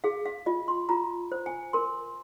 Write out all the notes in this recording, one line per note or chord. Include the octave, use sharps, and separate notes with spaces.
G#4 F5
F5
F4 D#5
C6
F4 A#5
C5
G#5
A#4 C6